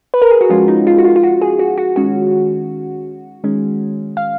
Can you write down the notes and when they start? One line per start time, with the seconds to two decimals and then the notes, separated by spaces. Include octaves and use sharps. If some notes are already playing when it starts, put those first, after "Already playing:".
0.14 B4
0.22 A#4
0.31 G#4
0.41 F#4
0.50 F3 G#3 C#4 F4
0.68 D#4
0.87 F4
0.98 F#4
1.04 F4
1.16 F4
1.23 F#4
1.41 G#4
1.59 F#4
1.78 F#4
1.96 D#3 G#3 C#4 F#4
3.44 D#3 G#3 C#4
4.17 F5